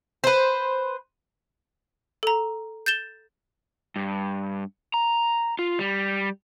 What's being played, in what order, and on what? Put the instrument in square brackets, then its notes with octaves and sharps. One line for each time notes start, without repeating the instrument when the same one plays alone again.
[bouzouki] B4 C5
[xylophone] A4 A#5
G6 A6 E7 G7
[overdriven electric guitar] G2
A#5
F4
G3